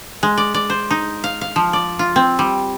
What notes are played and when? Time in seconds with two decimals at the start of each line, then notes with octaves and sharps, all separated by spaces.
0.23 G#3
0.38 D5
0.54 D5
0.70 C5
0.90 D#4
1.24 F5
1.41 F5
1.56 F3
1.73 D5
1.99 F4
2.16 C4
2.39 G3